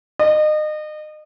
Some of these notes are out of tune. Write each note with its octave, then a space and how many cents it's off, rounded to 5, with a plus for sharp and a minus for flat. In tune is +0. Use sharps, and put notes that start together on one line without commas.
D#5 -30